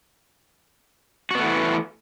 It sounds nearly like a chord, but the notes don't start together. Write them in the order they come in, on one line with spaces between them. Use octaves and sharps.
F#4 B3 A3 E3